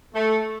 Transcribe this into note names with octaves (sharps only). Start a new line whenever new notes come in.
A3